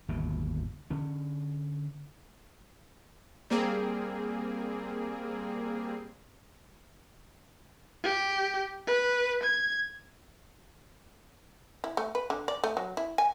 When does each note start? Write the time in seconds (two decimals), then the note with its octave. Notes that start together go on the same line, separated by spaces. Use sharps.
0.08 G1 D#2 G#2 B2
0.90 D3 C#4
3.50 G3 A#3 C4 G#4
8.04 G4
8.87 B4
9.43 G#6
11.84 E4
11.97 A3
12.15 B4
12.30 D3
12.48 D5
12.64 A3
12.77 F#3
12.97 E4
13.18 G#5